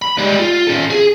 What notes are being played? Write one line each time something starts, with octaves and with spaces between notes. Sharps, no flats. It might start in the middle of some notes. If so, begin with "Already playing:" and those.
B5
G3 G#3
F4
C#4 A4
G#4